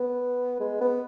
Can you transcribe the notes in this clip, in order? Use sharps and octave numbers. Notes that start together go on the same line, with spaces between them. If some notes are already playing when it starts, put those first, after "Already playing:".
Already playing: B3
G#3
B3